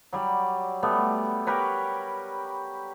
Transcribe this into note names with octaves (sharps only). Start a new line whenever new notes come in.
F#3 G3 D5
G3 A3 B3
G4 A#4 B4 C#5